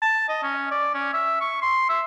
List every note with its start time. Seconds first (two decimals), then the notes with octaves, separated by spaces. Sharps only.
0.02 A5
0.29 D#5
0.43 C#4
0.71 D5
0.94 C#4
1.13 E5
1.41 C#6
1.62 C6
1.89 E5